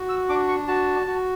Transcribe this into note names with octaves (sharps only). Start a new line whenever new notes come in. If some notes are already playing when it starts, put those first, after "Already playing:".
Already playing: F#4
E6
D4 D6
C#6
F#4 A5
F#4